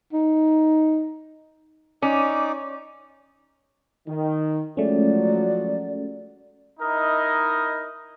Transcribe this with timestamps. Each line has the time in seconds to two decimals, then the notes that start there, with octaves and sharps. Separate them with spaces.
0.13 D#4
2.02 C#4 D#4 D5 D6
4.07 D#3
4.77 F3 F#3 G#3 A3 C#4 F#4 D5
6.80 D#4 E4 A#4 D#5